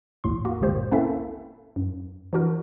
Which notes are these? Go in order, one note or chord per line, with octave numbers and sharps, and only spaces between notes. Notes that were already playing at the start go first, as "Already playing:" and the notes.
A1 D#2 A2 C6
A#3 F#4
G1 C#2 A#2 G4 C5
A#3 C4 C#4 E4 A4 E5
F#2
E3 D4 F#4 A#4